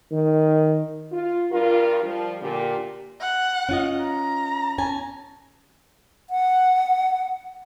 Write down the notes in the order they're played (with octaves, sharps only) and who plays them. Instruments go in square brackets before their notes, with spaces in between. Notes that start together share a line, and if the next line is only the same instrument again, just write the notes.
[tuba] D#3
[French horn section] F4
G2 F4 A#4
F3 G3
A#2 D3 G4
[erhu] F#5
[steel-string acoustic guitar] C#4 F4 D#5
[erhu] A#5
[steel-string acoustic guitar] C#4 G#5 A5
[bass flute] F#5